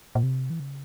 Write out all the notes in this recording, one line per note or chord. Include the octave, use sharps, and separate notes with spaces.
A#2
C3
E3
C#3